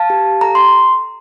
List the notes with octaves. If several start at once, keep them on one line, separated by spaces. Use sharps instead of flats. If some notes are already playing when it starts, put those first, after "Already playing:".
Already playing: F5 A5
G4
A4 A#5
C6